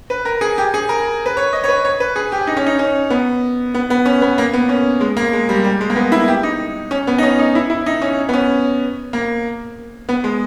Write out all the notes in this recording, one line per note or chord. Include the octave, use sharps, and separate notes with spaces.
B4
A#4
G#4
G4
G#4
A#4
B4
C#5
D#5
C#5
B4
C#5
B4
G#4
G4
D#4
C#4
D#4
C#4
B3
B3
B3
C#4
B3
A#3
B3
C#4
G#3
A#3
G#3
G3
G3
G#3
A#3
B3
E4
G4
D#4
C#4
B3
D#4
C#4
D#4
E4
E4
D#4
C#4
B3
C#4
A#3
B3
G#3